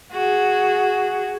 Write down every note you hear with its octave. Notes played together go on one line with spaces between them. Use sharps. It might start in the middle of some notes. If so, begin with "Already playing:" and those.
F#4 G#4